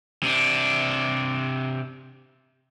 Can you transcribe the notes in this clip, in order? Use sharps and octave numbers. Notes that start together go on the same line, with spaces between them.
C3 D4